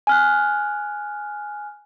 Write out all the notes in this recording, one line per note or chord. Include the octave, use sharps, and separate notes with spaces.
G#5 F6 F#6